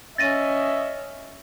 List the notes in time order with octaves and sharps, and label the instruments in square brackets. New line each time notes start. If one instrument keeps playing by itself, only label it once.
[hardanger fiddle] C#4 [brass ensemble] D#5 E5 [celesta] A6 A#6 D#7